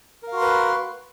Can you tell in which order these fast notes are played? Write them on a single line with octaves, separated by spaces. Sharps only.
A#4 F5 F#4 C6 B4